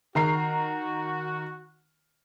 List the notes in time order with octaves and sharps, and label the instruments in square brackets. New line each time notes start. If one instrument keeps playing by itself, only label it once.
[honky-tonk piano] D#3 A#5 C7 [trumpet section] F#4